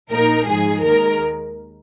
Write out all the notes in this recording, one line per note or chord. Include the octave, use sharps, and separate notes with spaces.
A#1 A#2 A#3 D#4 A#4
G#2 F3 G#3 D#4 G#4
D#2 D#3 G#3 A#4